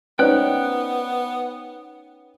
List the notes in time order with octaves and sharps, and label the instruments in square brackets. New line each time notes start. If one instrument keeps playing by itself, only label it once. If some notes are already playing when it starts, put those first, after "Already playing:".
[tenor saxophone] B3 [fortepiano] C#4 D#4 [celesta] B4 C5 D5 [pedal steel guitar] G5 F#6